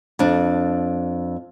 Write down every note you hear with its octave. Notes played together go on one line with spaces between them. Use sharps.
F2 D4